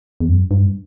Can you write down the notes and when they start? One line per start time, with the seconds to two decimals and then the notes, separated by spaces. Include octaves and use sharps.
0.20 E2
0.29 F#2
0.51 G2